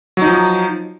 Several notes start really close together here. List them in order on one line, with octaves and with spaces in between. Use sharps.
F#3 D#4 F3